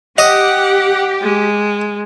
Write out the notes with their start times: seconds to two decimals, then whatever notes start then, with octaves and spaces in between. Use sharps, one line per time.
0.18 G4 D#5 F#5
1.22 G#3